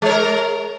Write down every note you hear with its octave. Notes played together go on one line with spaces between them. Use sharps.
G#3 A#4 C#5